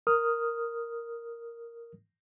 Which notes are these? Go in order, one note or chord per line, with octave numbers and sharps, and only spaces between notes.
A#4 D#6 F6